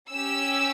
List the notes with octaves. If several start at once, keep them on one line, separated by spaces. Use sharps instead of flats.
C#4 G4 E6